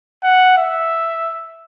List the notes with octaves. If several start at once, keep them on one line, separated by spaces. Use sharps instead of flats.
F#5
E5